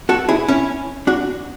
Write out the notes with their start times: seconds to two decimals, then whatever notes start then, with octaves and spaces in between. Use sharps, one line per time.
0.09 F#4 A4
0.29 E4 G#4
0.48 C#4 E4
1.07 D4 F#4